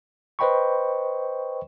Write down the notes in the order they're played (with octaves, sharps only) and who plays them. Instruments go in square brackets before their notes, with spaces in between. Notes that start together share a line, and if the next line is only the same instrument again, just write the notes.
[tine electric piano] B4 C5 D#5 G5 B5 C#6